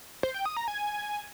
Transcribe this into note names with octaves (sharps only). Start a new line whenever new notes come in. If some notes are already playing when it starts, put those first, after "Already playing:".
C5
G5
D#6
A#5
G#5